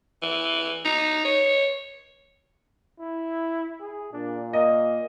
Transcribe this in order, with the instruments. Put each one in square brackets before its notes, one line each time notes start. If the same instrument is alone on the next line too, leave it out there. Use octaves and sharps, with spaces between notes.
[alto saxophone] E3
D#4
C#5
[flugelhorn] E4
G#4
[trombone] A#2 [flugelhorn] D4
[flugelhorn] A#3 [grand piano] D#5